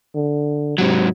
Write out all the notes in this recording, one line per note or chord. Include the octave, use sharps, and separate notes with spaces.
D3
G#2 C3 F#3